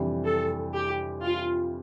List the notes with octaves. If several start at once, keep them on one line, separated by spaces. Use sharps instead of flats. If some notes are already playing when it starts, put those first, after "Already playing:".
Already playing: F2 C3 E3 G3 D4
A4
G4
F4